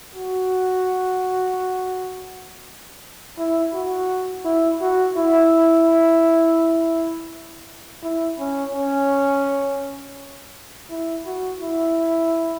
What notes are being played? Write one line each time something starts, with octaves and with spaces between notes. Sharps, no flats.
F#4
E4
F#4
E4
F#4
E4
E4
C#4
C#4
E4
F#4
E4